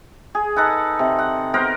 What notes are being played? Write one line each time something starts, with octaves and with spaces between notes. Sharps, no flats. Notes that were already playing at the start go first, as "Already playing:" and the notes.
G#4
D#4 A4 B4 F#5
C3
F#5
B3 A#4 C5